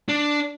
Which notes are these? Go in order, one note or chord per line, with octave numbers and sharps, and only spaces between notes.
D4